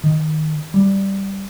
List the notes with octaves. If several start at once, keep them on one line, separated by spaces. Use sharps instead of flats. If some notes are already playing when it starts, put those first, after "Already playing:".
D#3
G3